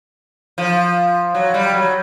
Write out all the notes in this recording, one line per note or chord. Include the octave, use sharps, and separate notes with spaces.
F3
F#3
G3
F#3